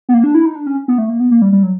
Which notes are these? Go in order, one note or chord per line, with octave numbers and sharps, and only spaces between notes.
B3
A#3
D4
E4
D#4
D4
C#4
B3
A3
A#3
B3
A#3
G3
G3
F#3